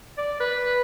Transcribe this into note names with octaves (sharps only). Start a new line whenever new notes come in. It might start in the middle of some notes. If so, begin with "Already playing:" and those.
D5
B4